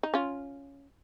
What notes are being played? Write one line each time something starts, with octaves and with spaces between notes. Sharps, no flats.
D#4
C#4 F4